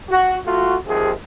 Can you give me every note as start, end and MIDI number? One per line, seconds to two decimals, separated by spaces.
0.11 0.36 66
0.46 0.75 57
0.46 0.75 65
0.46 0.75 66
0.86 1.12 39
0.86 1.12 48
0.86 1.12 53
0.86 1.12 68